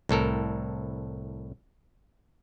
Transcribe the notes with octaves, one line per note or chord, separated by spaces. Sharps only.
C2 A2 A4 A#4